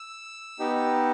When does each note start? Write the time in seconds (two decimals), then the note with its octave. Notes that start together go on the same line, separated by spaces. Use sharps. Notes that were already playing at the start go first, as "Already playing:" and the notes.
Already playing: E6
0.59 B3 D#4 G4